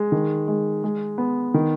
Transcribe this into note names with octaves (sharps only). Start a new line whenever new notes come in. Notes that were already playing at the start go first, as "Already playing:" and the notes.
Already playing: G#3
D#3
G#3
G#3
B3
D#3